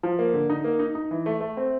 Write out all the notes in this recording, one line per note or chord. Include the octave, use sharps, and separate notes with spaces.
F3
A#3
D3
D#4
A#3
D#4
D#4
E3
A3
A3
C4